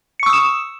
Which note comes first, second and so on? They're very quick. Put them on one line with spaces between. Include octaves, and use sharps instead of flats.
C#7 C#6 E6 D#6 E7